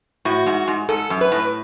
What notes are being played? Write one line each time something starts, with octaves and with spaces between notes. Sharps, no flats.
A2 F#4
G#2
G#2
G#2 A4
F#2
B4
A2